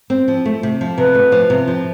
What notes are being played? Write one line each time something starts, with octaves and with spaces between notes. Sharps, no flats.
C4
F3
A3
C3
F3
C3 B4
A3
F3
C3
F3